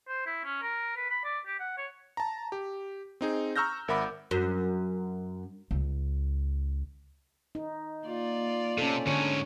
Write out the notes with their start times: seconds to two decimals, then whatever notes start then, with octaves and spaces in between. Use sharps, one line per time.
0.08 C5
0.26 E4
0.45 C#4
0.62 A#4
0.97 B4
1.10 B5
1.24 D5
1.47 G4
1.60 F#5
1.78 C#5
2.17 A5 A#5
2.52 G4
3.21 C4 D#4 G#4
3.56 A#5 C#6 E6 F6 G6 A#6
3.88 G#1 A#4 E5 F#5 B5 D6
4.31 F#2
5.71 C#2
7.55 D#4
8.05 A#3 F4 D5
8.78 C3 C#4 A4
9.06 G#2 D3 C#4 C#5